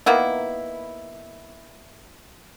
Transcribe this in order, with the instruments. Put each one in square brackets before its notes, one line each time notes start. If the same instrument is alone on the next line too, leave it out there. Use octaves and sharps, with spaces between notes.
[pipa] D#3 A#3 B3 E4